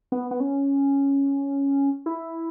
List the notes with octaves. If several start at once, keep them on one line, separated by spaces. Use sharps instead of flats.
B3
B3
C#4
E4